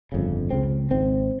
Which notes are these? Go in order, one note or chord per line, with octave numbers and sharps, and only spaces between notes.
G1 F2 C#3
C#2 C#3 C4
G#1 G#2 C4